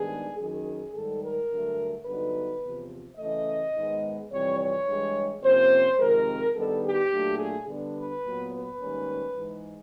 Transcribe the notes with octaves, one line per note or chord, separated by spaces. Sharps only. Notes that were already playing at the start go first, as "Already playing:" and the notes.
Already playing: G#2 D#3 G3 B3 D4 G#4
F#2 D#3 F#3 G#4
G#2 D#3 G3 A4
A#4
G2 D3 F#3 A3
G2 D3 F#3 B3 D#4 B4
E2 C3 F3
C#3 E3 A3 D#5
G#2 D#3 G#3 B3
F2 C3 E3 G3 C#5
C#5
G2 E3 G#3
C3 F3 A#3 C#4 C5
F2 C3 D#3 G#3 A#4
G2 D#3 G3 B3 D#4 A4
G4
A#2 F#3 A3 D4
G#4
D3 G3 B3 D4
B4
A#2 F#3 B3
B4
G#2 D#3 G3 A#3 C#4
G#2 E3 G#3